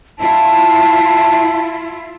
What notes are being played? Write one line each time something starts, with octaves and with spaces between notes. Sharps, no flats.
E4 F4 A5